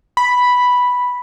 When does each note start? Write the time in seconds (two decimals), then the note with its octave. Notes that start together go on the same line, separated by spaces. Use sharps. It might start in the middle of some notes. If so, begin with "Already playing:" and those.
0.17 B5